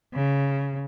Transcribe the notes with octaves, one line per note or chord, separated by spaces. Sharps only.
C#3